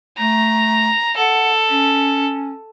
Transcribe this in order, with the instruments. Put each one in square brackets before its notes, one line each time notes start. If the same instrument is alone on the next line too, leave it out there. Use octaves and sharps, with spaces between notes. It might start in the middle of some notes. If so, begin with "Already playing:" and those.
[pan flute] A3 [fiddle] A#5
[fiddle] A4 [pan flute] F#5
[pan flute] C#4